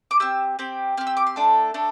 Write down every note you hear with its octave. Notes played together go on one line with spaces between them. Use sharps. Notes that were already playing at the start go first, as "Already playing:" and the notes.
D6
C4 G4 E6
C4 G4
C4 G4 F6
E6
D6
C6
A3 D4 A4
A3 D4 A4